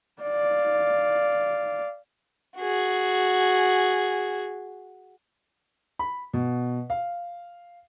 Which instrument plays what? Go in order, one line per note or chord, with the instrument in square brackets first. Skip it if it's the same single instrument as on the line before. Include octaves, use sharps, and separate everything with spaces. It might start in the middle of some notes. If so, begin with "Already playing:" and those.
[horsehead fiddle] D5 F5
[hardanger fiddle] F#4 G#4
[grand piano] B5
B2
F5